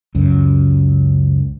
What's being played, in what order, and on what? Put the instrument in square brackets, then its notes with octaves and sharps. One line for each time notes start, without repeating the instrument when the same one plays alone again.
[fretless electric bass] C#2 F#2